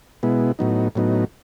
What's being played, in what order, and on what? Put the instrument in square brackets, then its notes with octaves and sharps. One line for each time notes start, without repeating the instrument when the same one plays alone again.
[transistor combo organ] B2 G#3 B3 E4
A2 F#3 B3 D#4
A2 F#3 B3 D#4